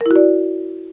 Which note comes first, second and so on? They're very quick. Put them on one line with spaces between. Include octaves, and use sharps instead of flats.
A#4 E4 F#4 D5